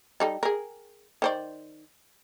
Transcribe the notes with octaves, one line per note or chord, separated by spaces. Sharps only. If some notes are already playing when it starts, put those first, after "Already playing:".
G3 D#4 A4
G#4 A#4
D#3 C5 D5